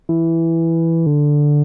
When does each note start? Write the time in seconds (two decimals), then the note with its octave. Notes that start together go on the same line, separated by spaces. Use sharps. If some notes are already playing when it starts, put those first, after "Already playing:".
0.09 E3
1.06 D3